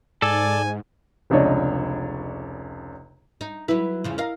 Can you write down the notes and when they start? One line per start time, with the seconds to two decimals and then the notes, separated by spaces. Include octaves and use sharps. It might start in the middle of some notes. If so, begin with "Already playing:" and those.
0.22 G#2 A4 D5 G#5
1.30 F1 C#2 C#3 D4 C#5 D#5
3.41 D#4
3.68 F#3 E4 B4
4.04 E2 C#3 F3
4.18 A#4 D#5 F5